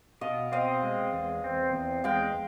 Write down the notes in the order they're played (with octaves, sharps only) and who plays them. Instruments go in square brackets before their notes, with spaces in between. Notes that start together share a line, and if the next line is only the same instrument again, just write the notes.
[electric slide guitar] B2 [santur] D#5 F5
[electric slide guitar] C4 [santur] D#5 F5
[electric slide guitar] G#3
E2
C4
E2
[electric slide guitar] G#3 [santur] F5 G5